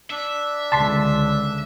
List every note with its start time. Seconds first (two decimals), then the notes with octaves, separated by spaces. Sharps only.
0.11 D4 E5
0.72 C#2 D3 A5 C6 B6